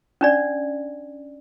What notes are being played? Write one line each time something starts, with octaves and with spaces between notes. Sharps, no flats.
C#4 D4 D5